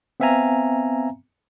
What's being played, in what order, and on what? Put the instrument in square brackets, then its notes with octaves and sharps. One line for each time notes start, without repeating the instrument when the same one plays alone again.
[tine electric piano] B3 C4 E5 F5 G#5 A#5